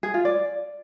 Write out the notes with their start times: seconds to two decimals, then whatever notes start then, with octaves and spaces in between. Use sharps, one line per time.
0.03 G#4
0.14 F4
0.25 D5